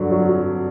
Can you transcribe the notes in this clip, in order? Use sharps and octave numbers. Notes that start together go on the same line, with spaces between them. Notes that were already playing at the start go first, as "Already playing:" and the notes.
Already playing: G2 D3 F#3
F#3
F#3